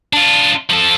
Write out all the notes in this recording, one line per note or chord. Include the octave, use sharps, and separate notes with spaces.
D4 F4
F3 A4